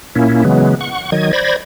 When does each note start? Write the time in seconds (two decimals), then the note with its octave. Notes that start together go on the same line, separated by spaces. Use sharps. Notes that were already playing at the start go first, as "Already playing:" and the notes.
0.15 A#2 A#3 C#4 E4
0.45 C#3 E3 F#3 G#3 B3
0.81 F#5 C#6
1.12 D#3 F#3 D#5 G#6
1.33 C5 D5 B5 G#6 A#6